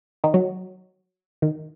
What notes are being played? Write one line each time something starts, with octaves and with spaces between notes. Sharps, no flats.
D#3
F#3
D#3